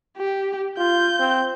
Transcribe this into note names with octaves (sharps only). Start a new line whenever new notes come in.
G4
F4 G6
C4